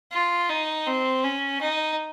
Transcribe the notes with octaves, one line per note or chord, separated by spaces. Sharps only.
F4
D#4
C4
C#4
D#4